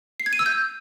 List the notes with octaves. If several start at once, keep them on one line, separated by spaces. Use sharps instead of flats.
C7
G#6
D#7
E6
G6